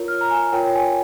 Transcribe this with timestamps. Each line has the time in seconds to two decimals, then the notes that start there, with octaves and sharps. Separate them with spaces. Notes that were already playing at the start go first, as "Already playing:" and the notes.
Already playing: F4 A#4 C#5
0.08 F6
0.21 A#5
0.31 G#5
0.53 F4 A#4 C#5 G5
0.75 G#5